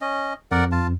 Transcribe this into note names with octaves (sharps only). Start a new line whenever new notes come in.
C#4 D#5
F2 A#4 D5 F#5
F4 A5